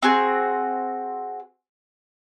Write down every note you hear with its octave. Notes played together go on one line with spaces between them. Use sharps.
C4 F#4 G#4